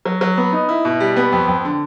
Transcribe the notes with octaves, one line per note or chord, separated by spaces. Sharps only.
F#3
F#3
B3
D#4
E4
B2
G3
B3
F2
F2
D3